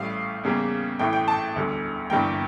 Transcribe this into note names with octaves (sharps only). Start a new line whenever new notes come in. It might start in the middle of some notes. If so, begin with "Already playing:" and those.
Already playing: A1 A2 G3 F5
E2 C#3 G3 A#3
A1 A2 E3 G5
G5
A5
E1 D2 D3 G3
G1 G2 E3 G3 A#3 G5